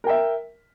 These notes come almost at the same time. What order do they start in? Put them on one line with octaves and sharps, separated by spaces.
A#4 G5 E5